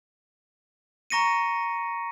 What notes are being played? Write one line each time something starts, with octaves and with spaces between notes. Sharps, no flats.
A#5 C#6 A#6 C#7 D#7